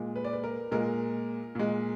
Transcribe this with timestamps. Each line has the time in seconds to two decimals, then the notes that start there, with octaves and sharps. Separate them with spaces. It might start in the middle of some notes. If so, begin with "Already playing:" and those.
Already playing: A#2 G#3
0.16 B4
0.24 D5
0.33 B4
0.44 A#4
0.72 A#2 G#3 A#4
1.55 A#2 G#3